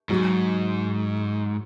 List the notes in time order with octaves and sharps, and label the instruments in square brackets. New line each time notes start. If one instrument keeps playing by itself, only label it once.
[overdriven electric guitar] G#2 [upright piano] F#3